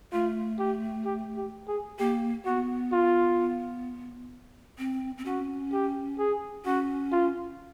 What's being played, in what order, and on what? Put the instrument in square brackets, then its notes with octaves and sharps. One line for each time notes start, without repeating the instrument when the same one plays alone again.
[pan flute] A3 [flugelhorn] F4
[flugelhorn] G4
G4
G4
G#4
[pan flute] A#3 [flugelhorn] G4
[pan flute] B3 [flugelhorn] F#4
[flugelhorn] F4
[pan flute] C4
C4
[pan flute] C#4 [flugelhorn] F#4
[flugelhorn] G4
G#4
[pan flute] C#4 [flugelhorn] F#4
[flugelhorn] F4